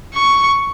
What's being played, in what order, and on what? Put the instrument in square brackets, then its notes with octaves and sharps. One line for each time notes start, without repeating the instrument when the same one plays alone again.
[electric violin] C#6